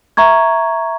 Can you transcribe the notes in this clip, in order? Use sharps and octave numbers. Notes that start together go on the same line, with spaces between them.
E5 A#5 C#6 G#6